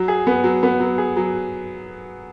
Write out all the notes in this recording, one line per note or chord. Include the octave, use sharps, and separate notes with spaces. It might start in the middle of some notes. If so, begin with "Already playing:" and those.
Already playing: F#3
G#4
B3
F#3
B3
F#3
G#4
F#3